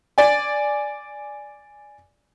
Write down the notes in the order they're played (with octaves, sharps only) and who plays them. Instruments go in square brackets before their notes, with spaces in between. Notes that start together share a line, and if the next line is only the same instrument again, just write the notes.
[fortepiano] D5 G#5